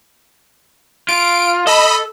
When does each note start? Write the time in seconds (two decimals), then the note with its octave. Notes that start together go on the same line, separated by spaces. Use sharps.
1.09 F4 D7
1.67 A4 D#5 B5